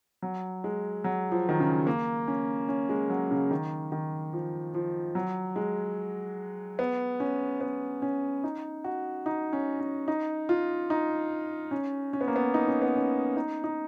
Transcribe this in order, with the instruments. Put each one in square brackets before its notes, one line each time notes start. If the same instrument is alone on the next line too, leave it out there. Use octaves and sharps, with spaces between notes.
[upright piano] F#3
G#3
F#3
F3
D#3
C#3
A#3
C#4
C#4
G#3
F#3
C#3
D#3
D#3
F3
F3
F#3
G#3
B3
C#4
B3
C#4
D#4
F#4
D#4
C#4
C#4
D#4
F4
D#4
C#4
C#4
B3
A#3
B3
D#4
C#4
B3
C#4
D#4
D#4